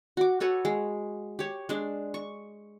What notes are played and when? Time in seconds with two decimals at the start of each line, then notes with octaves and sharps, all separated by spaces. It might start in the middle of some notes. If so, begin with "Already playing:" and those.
0.17 F#4 D6
0.40 F#4 A4 B4 C#5
0.65 G#3
1.39 G4 C#5
1.69 G#3 D4
2.14 C#6